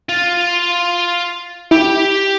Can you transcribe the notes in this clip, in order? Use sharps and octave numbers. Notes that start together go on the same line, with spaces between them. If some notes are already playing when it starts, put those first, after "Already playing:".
F4
E4 G4